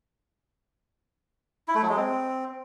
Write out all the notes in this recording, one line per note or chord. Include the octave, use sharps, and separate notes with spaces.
E4
A3
F#3
G#3
C4